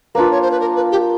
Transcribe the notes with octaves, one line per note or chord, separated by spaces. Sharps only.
A#3 D4 F4 B4
C#5
C5
B4
A#4
B4
G4